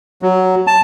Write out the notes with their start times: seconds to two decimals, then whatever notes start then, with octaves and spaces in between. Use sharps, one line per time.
0.22 F#3
0.67 A5